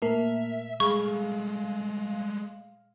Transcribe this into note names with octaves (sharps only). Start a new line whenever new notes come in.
A#2 A3 A#3 A#4 E5
G#3 A3 G#4 F5 B5 C#6